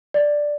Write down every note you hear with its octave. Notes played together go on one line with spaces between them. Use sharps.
D5